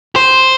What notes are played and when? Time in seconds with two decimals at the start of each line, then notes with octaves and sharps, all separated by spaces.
0.16 C5